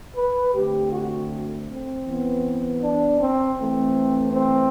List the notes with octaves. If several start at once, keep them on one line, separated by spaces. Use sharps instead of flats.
B4
D3 A3 C4 G4
F#4
C4
E3 B3
D4
C4
E3 A3 C4
C4